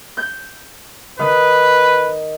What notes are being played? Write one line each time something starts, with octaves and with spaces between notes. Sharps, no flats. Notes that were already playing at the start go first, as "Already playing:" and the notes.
G6
D#3 B4